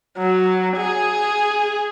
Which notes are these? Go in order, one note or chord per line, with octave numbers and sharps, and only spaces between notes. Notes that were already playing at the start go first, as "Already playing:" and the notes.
F#3
G#4